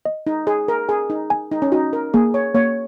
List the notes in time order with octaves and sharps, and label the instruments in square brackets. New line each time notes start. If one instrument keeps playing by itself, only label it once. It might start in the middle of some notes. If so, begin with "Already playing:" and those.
[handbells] D#5
[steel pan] D#4
[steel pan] G#4 [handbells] D#5
[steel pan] A#4
[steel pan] G#4 [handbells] G#5
[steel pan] D#4
[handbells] G#5
[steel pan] D#4
C#4
[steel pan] D#4 [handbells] F#4
[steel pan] A#4
[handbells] A#3 [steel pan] G#4
[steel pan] C#5
[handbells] A#3 [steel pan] C#5